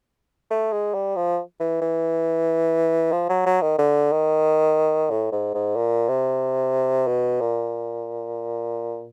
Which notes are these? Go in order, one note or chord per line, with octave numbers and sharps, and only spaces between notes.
A3
G#3
G3
F3
E3
E3
F3
F#3
F#3
D#3
D3
D#3
A2
G#2
G#2
A#2
C3
B2
A#2